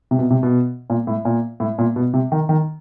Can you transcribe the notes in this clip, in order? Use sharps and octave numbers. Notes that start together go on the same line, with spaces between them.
C3
B2
C3
B2
A#2
A2
A#2
A2
A#2
B2
C3
D#3
D#3